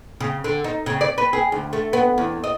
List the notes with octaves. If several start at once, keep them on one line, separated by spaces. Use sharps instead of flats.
C#3
D3
D#4
C#3
D5
B4
G#4
D2
A3
B3
E2
D#5